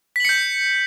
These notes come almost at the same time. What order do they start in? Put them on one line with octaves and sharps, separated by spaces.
B6 F#7 C#7 G6